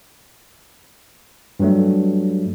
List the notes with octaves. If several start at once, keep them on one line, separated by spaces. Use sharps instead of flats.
G2 F#3 A3